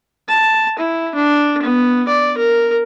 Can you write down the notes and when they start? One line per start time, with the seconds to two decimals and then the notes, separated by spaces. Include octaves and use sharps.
0.29 A5
0.79 E4
1.15 D4
1.63 B3
2.08 D5
2.38 A#4